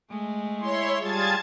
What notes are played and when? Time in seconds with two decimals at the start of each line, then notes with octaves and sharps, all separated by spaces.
0.10 G#3 A3
0.60 E4 C#5 C6
1.00 G3 F4 G#4 A5 G#6 A6